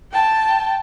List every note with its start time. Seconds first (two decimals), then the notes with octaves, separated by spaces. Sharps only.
0.12 G5 A5